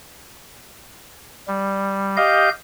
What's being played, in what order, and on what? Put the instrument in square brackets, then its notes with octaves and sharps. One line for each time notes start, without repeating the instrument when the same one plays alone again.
[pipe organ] G3
G4 D#5 F5 G6